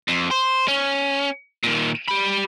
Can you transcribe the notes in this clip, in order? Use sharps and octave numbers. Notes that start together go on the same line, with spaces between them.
F2
C5
C#4
A#2 D#3
G4 B5